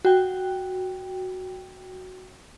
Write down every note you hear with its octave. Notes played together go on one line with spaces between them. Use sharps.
F#4 G5